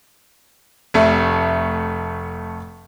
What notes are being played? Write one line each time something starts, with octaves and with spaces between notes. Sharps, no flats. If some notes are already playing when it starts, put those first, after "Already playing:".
F1 A3